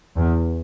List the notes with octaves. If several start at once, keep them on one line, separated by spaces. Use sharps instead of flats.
E2